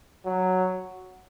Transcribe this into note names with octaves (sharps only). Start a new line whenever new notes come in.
F#3